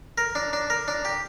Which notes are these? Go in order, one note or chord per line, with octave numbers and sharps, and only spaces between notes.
A#4
D4
D4
A#4
D4
G4